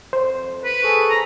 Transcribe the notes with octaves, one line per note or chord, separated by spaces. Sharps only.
F2 C5
B4
G#4 A4 C#6
A#5